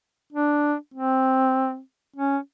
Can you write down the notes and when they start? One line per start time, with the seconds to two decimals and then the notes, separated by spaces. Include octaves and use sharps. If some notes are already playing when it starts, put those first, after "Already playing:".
0.33 D4
0.94 C4
2.16 C#4